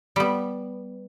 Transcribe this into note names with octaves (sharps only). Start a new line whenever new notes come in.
G3 B3